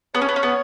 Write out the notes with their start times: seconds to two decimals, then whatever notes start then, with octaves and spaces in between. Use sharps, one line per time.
0.14 B3 C#5
0.22 C#4
0.29 B3
0.36 C#4
0.43 B3